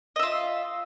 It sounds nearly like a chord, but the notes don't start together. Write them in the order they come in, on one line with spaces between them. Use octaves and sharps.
D#5 E5 F4